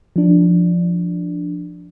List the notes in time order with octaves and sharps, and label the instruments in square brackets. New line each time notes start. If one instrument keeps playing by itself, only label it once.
[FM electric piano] F3 D4